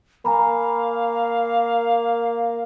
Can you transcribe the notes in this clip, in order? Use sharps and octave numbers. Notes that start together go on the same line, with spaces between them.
A#3 F5 G#5 A#5 B5